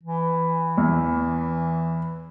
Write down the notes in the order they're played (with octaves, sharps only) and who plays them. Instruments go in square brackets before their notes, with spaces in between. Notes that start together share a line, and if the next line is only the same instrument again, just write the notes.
[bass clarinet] E3
[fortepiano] E2